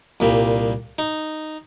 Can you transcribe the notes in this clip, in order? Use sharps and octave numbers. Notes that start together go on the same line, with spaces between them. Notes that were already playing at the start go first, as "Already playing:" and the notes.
C2 A#2 G3
D#4